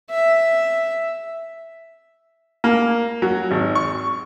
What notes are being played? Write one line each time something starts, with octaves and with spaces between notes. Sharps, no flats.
E5
A#3
F#3
G#1
C#6